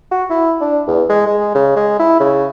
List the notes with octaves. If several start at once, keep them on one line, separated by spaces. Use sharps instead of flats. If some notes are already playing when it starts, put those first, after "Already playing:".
F#4
E4
D4
E2
G#3
G#3
C#3
G#3
E4
C#3